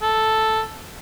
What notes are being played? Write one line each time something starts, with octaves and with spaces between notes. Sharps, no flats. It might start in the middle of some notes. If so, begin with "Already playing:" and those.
A4